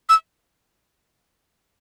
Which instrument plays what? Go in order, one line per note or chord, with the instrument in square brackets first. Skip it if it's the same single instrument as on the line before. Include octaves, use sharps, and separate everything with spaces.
[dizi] E6